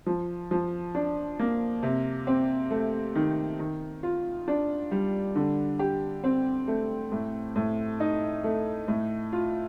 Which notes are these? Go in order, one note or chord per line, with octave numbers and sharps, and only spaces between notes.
F3
F3
D4
A#3
C3
C4
A3
D#3
D#3
F4
D4
G3
D3
G4
C4
A3
A2
A2
D#4
A3
A2
F4